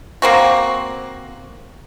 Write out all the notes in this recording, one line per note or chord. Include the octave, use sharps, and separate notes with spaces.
A#3 C4 F#4